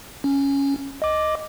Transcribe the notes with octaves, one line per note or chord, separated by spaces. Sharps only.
C#4
D#5 D6